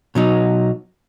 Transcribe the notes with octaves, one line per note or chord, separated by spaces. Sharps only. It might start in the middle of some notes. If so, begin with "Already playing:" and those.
B2 F#3 D#4